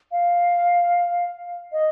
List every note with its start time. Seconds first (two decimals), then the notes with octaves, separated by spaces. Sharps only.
0.12 F5
1.72 D#5